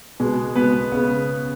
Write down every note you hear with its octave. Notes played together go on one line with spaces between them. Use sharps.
B2 G#3 B3
B2 G#3 B3 B4
C#3 B3